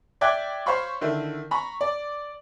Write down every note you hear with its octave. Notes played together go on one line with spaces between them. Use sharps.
D5 E5 G5 D6 F#6 G#6
C5 C#5 F5 B5 C#6
D3 D#3 E4
A#5 B5 C#6
D5